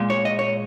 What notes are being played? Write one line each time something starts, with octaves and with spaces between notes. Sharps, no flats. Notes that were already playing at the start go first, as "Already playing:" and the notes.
Already playing: A#2 G#3
C#5
D#5
C#5